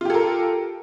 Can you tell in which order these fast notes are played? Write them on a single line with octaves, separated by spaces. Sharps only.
F4 G4 A4 A#4